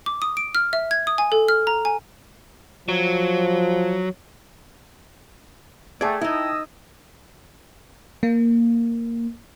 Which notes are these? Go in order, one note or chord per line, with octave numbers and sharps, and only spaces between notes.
D6
D#6
D7
F6
E5
G#6
D#6
G#5
A4
F6
A#5
G#5
F3 F#3
A3 G#4 D5 G5 A5 G#6
D#4 E4 A#4 D#5 D#6 E6
A#3